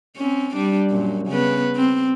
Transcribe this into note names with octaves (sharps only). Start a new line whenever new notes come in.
C4 C#4
G3 D4
F#2 A#2
C#3 B3 B4
C4